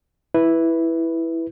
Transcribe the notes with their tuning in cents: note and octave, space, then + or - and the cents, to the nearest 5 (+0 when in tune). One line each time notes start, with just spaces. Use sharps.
E4 +0 B4 -5